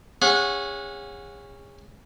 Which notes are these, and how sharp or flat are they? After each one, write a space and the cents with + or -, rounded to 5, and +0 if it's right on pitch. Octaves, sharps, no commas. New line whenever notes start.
C#4 +0 G#4 -35 F#5 -25